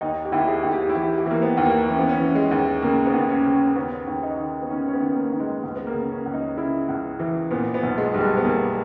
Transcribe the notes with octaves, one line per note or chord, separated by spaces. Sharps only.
D#2 D#4
G4
D#2 E4
G4
G#4
D#2
G4
E4
E3 G4
G4
E3 A#3
B3
D#2
A#3
E3 C#4
B3
C#4
E3
G#3
D#2
C#3 A#3
B3
D#2
C#4
C#3
C#4
C#4
D#2 B3
D#2
D#4
D#3
B3
D#3 C#4
C#4
B3
D#3
B3
A#3
D#3
G#3
C#2 G#3
B3
A#3
C#3
C#4
C#2
D#4
C#3 E4
C#2
E3
A#2 B3
B3
B1
G#3
B1 G3
G#3
B3
B1 A#3